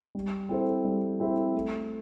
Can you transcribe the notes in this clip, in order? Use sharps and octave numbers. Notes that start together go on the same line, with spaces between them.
G3
C4 E4 A4 C5
G3
C4 E4 A4 C5
A3